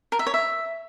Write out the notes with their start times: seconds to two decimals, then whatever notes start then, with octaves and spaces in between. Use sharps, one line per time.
0.12 A#4
0.19 E5
0.26 C#5
0.34 E5